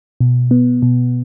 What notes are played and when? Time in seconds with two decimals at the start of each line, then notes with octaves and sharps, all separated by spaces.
0.20 B2
0.51 B3
0.82 B2